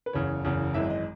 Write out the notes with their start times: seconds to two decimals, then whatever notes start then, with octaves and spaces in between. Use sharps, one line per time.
0.06 B4
0.13 F#1 E2 C#3 C#5
0.45 F#1 E2 C#3
0.74 G#1 F#2 E3 G#3 E5
0.90 D#5